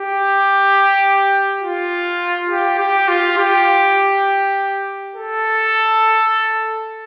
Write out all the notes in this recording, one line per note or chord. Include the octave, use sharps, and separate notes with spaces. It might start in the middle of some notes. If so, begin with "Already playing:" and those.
Already playing: G4
F4
G4
G4
F4
G4
A4